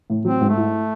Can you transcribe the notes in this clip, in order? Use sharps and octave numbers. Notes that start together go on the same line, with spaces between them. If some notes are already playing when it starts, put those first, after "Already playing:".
A2
F#3 C4
G#2
A3
E4